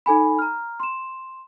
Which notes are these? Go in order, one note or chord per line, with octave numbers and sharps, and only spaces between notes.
D#4 A4 G#5 B5
A#5 F6
C6 E7